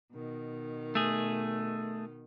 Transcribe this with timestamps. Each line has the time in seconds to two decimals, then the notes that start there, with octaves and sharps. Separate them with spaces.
0.11 B2 D#3
0.95 A3 G#4